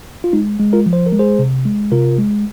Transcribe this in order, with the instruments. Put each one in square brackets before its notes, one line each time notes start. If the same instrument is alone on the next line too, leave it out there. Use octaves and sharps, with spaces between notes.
[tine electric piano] F4
G#3 D#4
G#3
F4 A#4
F3
C5
A#4
G#3
G#4 C5
C3
G#3
C3 F4 A#4
G#3